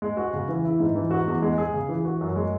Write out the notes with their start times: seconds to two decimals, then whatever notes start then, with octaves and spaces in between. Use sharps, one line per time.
0.02 G#3
0.17 F#4
0.33 C#3
0.48 E3
0.65 E4
0.80 G#2
0.95 E3
1.11 F#4
1.27 E2
1.42 G#3
1.58 G#4
1.73 C#3
1.89 E3
2.05 F#4
2.21 F#2
2.36 G#3